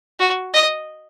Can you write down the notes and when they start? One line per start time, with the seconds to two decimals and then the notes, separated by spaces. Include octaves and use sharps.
0.20 F#4
0.54 D#5